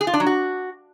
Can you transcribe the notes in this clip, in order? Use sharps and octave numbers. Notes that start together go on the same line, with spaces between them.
G#4
F4
D4
F#3
F#4